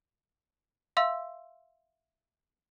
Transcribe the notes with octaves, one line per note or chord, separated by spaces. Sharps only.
E5 F5 C6 E6